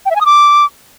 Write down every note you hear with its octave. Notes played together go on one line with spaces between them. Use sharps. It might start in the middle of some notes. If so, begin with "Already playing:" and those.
G5
E5
G#5
D#6
D6